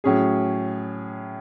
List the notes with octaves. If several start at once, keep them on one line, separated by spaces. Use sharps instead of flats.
A2 F#3 C#4 G#4